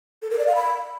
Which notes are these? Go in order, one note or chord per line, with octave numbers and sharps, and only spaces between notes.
A4
A#4
D5
F5
B5